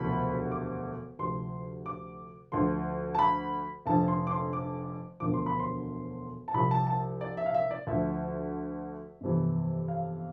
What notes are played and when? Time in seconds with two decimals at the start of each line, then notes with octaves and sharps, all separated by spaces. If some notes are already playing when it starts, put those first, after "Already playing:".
Already playing: E1 D2 C3 F3 B5
0.52 D6
1.19 D2 C3 F3 C6
1.86 D6
2.52 D2 D3 F3 C6
3.15 A5
3.19 B5
3.86 F1 F2 D3 F3 A5
4.08 C6
4.27 D6
4.31 C6
4.53 D6
5.20 E1 D2 D3 F3 D6
5.34 C6
5.46 B5
5.59 C6
6.48 A5
6.54 C2 C3 F3 B5
6.71 A5
6.87 A5
7.21 D5
7.37 E5
7.46 F5
7.54 E5
7.71 D5
7.87 D2 D3 F3 E5
9.21 G1 F2 C3 E3
9.88 F5